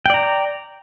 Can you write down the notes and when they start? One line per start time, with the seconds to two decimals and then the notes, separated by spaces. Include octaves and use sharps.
0.06 G5
0.10 D5
0.14 A#5